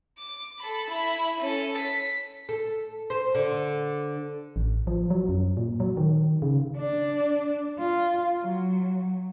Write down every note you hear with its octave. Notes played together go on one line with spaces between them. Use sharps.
D6
A4 B5
E4 B5
C#4 A4
B6
A4
C5
D3
A1
F3
F#3
F#2
A#2
F#3
D#3
C#3
D4
F4
F#3